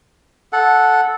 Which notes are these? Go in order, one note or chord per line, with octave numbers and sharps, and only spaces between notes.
A4 F#5